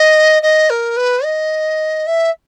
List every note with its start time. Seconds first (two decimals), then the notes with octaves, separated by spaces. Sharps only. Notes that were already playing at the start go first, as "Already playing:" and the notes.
Already playing: D#5
0.42 D#5
0.70 A#4
0.96 B4
1.24 D#5
2.06 E5